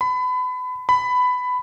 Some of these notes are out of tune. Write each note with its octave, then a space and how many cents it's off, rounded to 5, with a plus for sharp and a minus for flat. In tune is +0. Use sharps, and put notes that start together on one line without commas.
B5 +30
B5 +15